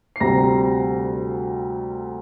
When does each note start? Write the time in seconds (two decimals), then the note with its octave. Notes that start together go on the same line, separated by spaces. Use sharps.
0.16 C7
0.20 D2 C3 G3 C4 A#5 A#6